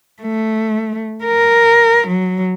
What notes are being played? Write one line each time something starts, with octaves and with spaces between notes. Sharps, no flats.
A3
A#4
F#3